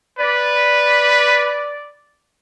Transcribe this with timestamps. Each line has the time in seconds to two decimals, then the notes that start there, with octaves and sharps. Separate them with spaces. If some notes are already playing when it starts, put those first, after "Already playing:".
0.19 B4 D5